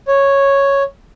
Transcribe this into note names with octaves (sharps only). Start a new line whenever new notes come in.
C#5